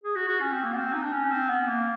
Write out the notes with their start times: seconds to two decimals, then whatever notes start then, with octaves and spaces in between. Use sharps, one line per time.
0.04 G#4
0.16 F#4
0.29 F#4
0.41 C#4
0.52 C4
0.64 A#3
0.73 B3
0.77 C4
0.94 D#4
1.03 D4
1.12 C#4
1.31 C4
1.49 B3
1.67 A#3